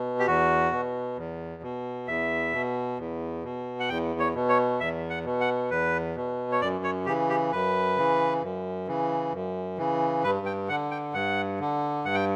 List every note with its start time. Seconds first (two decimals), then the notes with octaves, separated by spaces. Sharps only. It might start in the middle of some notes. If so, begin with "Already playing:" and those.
Already playing: B2
0.19 G4
0.27 E2 F#4
0.72 B2
1.17 E2
1.62 B2
2.08 E2 E5
2.53 B2
2.99 E2
3.44 B2
3.80 F#5
3.89 E2 G5
4.19 C#5
4.35 B2
4.49 C#5
4.80 E2 E5
5.10 F#5
5.25 B2
5.40 F#5
5.70 E2 B4
6.16 B2
6.52 C#5
6.61 F#2 D5
6.84 C#5
7.06 C#3 E3 G4
7.29 G4
7.52 F#2 B4
7.97 C#3 E3
8.42 F#2
8.87 C#3 E3
9.33 F#2
9.78 C#3 E3
10.24 G2 B4
10.46 G5
10.69 D3 F#5
10.91 G5
11.14 G2 F#5
11.60 D3
12.05 G2 F#5
12.15 G5